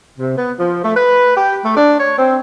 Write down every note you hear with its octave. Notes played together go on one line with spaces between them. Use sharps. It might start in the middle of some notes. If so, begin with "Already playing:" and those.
C3
B3
F3
A3
B4
G4
A3
D4
C#5
C4